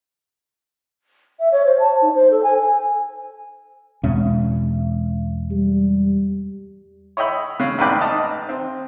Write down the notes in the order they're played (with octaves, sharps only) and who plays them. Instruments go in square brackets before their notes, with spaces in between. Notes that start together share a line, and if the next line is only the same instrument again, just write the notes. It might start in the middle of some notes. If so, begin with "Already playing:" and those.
[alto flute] E5
C#5
C5
A5
D#4
C5
A4
G#5
G#5
[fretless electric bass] E2 B2 C#4 [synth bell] G#3
[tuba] G3
[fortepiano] C#5 D#5 E5 G5 B5
C#3
A1 G#2 C#3 B4 D5 G5
A1 D#4 A5 D#6
C4